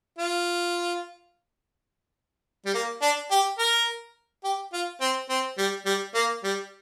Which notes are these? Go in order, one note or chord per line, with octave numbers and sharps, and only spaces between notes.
F4
G3
A#3
D4
G4
A#4
G4
F4
C4
C4
G3
G3
A#3
G3